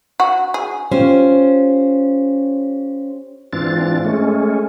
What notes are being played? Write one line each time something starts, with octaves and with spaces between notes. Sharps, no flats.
F#4
G#4
C#4 F4 G4 C5
G#2 E3 C4 D4 F4 A6
G#3 A3 C#4